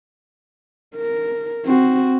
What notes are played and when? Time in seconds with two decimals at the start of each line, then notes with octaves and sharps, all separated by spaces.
0.96 A#4
1.66 C4 F#4